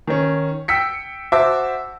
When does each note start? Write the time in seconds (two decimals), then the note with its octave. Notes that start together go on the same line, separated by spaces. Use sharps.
0.07 D#3 C#4
0.68 G5 E6 B6 C#7
1.32 F#4 C5 E5 A5 D6